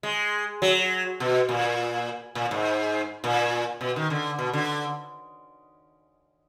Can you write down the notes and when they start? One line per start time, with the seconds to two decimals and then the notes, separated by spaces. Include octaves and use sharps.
0.03 G#3
0.62 F#3
1.20 B2
1.49 A#2
2.35 A#2
2.51 G#2
3.24 A#2
3.81 B2
3.96 D#3
4.10 D3
4.39 B2
4.53 D3